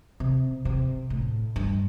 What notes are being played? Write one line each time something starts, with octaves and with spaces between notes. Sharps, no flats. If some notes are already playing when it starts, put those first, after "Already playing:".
C3
C3
A2
G2